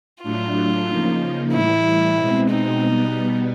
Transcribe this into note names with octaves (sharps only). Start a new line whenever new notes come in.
A2 F#3 A3 D4 F4
C#3 F3 A#3 D#4
A2 E3 G3 E4
B2 G#3 C4
D#4
B2 G3 B3